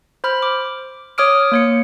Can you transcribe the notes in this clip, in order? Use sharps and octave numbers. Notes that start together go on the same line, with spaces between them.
C5 B5 F6
D6
C#5 D6 D#6 F6 D7
A#3 C#5 C#7